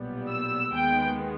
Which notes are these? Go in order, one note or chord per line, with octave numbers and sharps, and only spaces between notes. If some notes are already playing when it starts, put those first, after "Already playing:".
Already playing: B1 A#2 G3 B3
E6
D#2 D#3 G#3 B3 G5